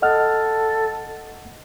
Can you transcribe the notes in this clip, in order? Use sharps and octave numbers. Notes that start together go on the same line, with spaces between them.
A4 D#5 F#5 F6